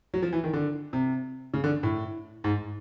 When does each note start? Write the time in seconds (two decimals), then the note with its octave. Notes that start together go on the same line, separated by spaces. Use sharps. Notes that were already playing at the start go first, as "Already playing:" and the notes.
0.14 F#3
0.22 F3
0.32 E3
0.44 D#3
0.53 D3
0.93 C3
1.54 C#3
1.64 D3
1.83 A2
2.44 G#2